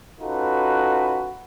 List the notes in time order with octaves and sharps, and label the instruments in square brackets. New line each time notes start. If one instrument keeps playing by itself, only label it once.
[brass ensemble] C#4 D#4 F4 F#4 A4 B4